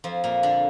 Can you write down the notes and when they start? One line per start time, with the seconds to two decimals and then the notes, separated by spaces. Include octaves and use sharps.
0.04 F2 F3
0.24 A#2 A#3
0.43 D3 D4